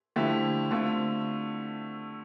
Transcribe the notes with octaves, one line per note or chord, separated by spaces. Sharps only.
D3 F3 A3 E4 G4
D3 A3 C4 F4